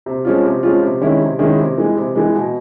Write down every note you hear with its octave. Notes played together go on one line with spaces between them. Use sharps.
C3
F3 G#3 C#4 F4
C3
F3 G#3 C#4 F4
C3
D#3 G#3 C#4 E4
C3
D#3 G#3 C#4 E4
C3
E3 G#3
C3
E3 G#3
B2